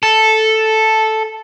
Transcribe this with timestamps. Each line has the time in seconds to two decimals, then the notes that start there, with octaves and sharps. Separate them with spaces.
0.03 A4